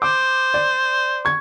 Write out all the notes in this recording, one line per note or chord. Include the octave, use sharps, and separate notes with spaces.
C5 D6
D5
C#6 G#6